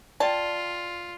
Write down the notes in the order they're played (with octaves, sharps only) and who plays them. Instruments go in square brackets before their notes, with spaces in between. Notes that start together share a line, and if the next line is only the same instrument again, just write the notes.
[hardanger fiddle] F4 [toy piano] D5 G5 [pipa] A5